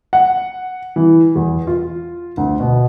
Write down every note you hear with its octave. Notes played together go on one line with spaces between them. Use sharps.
F#5
E3
E2
F4
D2
B2